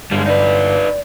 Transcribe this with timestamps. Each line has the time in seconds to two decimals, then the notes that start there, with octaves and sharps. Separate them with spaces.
0.11 G1 G3 G#3
0.26 D#4 B4 D5